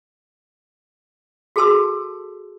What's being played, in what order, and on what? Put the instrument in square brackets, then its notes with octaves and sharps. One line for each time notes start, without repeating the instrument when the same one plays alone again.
[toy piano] F#4 G#4 A4 A5 C6 E6